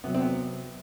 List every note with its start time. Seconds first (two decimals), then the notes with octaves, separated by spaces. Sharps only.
0.04 C3 F#3 B3
0.15 C4
0.20 B3